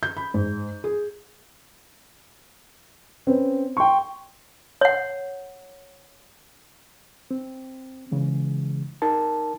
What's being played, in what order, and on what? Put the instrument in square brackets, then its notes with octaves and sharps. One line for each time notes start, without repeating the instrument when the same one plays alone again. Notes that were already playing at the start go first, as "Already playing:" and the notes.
[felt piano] G6
B5
G#2
G#4
[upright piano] C4 C#4 B4
G5 C6 C#6
[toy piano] C#5 F#5
[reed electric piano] C4
C#3 E3 G#3
D#4 A#4 A5